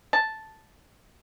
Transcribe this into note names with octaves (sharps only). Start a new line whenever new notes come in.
A5